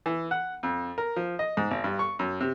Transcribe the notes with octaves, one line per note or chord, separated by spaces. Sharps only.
E3
F#5
F2
A#4
F3
D#5
G#2
G#1
G2
C#6
F#2
C3